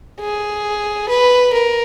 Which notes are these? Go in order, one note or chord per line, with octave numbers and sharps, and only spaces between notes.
G#4
B4
A#4